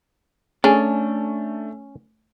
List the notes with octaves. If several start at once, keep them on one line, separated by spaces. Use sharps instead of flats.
A3 C#4 D4 G#4 A4